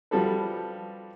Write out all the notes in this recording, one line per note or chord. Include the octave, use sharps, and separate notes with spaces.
F3 G3 F#4 A4 B4